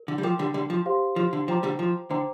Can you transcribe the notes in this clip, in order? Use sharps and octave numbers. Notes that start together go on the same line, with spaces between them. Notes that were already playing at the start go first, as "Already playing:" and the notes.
Already playing: A#4
D3
G3
F3 A#4 G5 D6
D3 G3
D3 G3
F3
G4 C5 F5 C6
F3
D3
F3 C5 G5 A#5 D6
D3 G3
F3
D3 C5 G5 A#5 D6